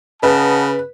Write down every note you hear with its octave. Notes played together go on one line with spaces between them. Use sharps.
C#3 B4 D#5 F#5 A5